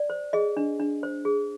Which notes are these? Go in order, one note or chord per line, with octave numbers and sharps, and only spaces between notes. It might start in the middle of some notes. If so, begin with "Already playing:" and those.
Already playing: D5
C5
G#4 D#5
D4
D4
C5
G#4